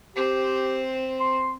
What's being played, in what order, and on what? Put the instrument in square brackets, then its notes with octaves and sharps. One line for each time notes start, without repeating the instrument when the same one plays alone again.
[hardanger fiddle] C4 C5 [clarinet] G4
[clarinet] C6